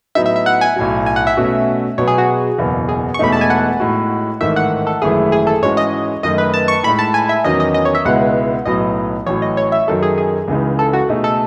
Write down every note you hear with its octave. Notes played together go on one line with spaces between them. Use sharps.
A2 F#3 B3 D#4 E5
E5
E5
F#5
G#5
B1 A2 F#3
G#5
F#5
E5
B2 A3 C#4 F#4
B2 F#3 B3 C#5
G#4
F#4
F#1 E2 B2
G#4
C#6
E1 E2 B2 A3 D#4 B5
A5
G#5
F#5
A2 G#3 D#4 F#4
A1 G#2 D#3 A3 E5
F#5
A4
G#1 F#2 E3 A3 E4 G#4
G#4
A4
G#2 E3 G#3 C#4 F#4 C#5
D#5
F#2 D#3 A3 D#5
B4
A5
C#6
A2 G#3 D#4 B5
A5
G#5
E5
E2 D#3 F#3 C#4 D#5
D#5
D#5
C#5
E5
C#2 B2 G#3 B3 E4 F#5
B1 A2 F#3 B3 D#5
A1 A2 F#3 C#5
D#5
C#5
E5
F#2 D#3 F#3 A4
G#4
G#4
C#2 C#3 E3 G#3 D#4
A4
F#4
B2 A3 D#4 G#4
A4